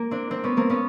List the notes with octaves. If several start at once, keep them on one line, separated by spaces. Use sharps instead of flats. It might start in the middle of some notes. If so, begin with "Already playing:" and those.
Already playing: A#3
C4 D4
C4 D4
B3 C#4
A#3 C4
B3 C#4